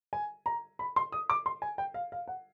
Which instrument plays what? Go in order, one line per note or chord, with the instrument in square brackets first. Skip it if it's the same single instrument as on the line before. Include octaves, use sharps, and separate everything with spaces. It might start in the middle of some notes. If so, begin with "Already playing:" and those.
[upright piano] G#5
A#5
B5
C6
D#6
D6
C6
G#5
G5
F5
F5
F#5